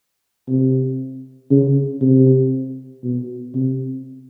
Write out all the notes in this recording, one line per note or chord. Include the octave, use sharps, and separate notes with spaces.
C3
C#3
C3
B2
C3